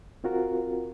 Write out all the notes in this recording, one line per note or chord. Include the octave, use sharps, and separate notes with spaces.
C4 F4 F#4 A#4